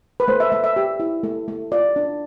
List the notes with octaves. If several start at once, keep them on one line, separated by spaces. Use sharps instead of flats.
B4
A3 C5
E5
A3 E5
E5
G4
E4
A3
A3
F4 D5
D4